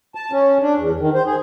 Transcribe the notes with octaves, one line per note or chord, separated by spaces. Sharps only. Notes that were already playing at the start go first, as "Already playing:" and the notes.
A5
C#4
D4
E2
D#3
C5
G#4